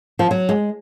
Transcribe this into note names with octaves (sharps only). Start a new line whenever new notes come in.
F3
F#3
G#3